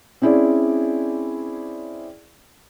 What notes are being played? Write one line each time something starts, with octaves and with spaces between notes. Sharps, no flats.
C4 C#4 E4 G#4 D5